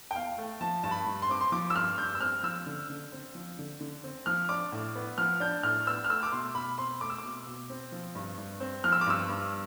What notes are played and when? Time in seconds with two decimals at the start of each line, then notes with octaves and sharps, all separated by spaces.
0.11 G5
0.15 E2 F5
0.38 A3
0.61 F3 A5
0.83 G2 A5
0.91 B5
1.06 G2
1.22 C6
1.29 C4 D6
1.41 C6
1.52 F3 D6
1.70 E6
1.75 G2 F6
1.98 G2 G6
2.15 E6
2.20 C4 F6
2.43 F3 E6
2.66 D3
2.90 D3
3.12 C4
3.35 F3
3.59 D3
3.81 D3
4.04 C4
4.26 F3 F6
4.49 D4 D6
4.72 A2
4.95 B3
5.18 F3 F6
5.40 D4 G6
5.63 A2 F6
5.87 B3 E6
6.05 F6
6.09 A3 E6
6.23 D6
6.32 B2 C6
6.55 B2 B5
6.78 C4 C6
7.01 A3 D6
7.10 E6
7.18 B2 D6
7.47 B2
7.70 C4
7.92 F3
8.15 G2
8.38 G2
8.60 C4
8.84 F3 F6
8.92 E6
9.01 D6
9.06 G2 E6
9.29 G2